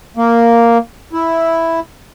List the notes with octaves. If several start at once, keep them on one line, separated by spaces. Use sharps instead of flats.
A#3
E4